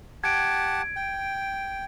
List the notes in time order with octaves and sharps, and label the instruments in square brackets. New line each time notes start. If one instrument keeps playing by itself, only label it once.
[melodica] G4 F#5 A5 [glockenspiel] G#6 D7
[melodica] G5